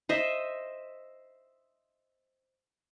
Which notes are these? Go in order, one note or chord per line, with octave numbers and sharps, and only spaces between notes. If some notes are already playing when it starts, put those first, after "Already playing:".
C5 D#5 E5